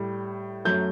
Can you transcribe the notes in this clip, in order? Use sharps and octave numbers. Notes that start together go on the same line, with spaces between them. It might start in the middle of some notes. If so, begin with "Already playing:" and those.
Already playing: A2 G3
F#2 F#3 A3 G6